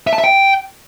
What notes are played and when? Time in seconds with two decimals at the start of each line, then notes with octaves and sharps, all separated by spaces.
0.07 E5
0.13 A5
0.18 E5
0.24 G5